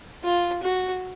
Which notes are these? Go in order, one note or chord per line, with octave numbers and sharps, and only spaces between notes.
F4
F#4